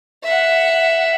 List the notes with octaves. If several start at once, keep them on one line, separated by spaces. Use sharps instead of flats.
E5 F#5